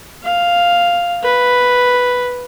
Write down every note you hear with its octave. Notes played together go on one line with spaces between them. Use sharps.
F5
B4